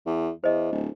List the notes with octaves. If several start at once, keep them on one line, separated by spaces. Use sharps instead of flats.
E2
E2 C5 D#5
D1